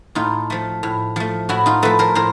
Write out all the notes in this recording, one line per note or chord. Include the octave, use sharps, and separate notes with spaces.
A2 D#4 F4
F3 A3
A2
F3 A3
A2 E4 F#4
D#4 F4
F3 A3 A4 B4
A#4 C5
A2 A#4 C5